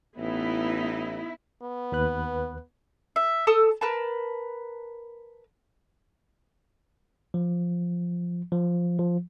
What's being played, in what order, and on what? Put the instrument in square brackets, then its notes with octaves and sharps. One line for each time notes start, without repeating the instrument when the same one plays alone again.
[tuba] A1 [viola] B3 D#4 [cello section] E4
[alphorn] B3
[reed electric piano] D#2 B4 F#6
[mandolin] E5
A4 A5 D#6 E6
A#4 B4 A5
[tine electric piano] F3
F3
F3